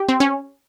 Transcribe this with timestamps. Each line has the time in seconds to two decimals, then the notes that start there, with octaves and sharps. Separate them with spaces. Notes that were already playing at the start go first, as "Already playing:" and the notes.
Already playing: G4
0.09 C4
0.20 C#4